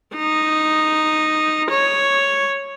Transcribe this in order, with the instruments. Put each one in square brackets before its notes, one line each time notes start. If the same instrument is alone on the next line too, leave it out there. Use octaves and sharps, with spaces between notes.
[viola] D#4
C#5